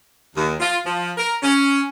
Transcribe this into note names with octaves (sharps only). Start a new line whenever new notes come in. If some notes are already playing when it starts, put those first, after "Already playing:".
D#2
F4
F3
A#4
C#4